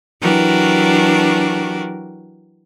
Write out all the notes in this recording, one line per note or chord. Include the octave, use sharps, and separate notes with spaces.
E3 F#3 D4 F#4 G4 A#4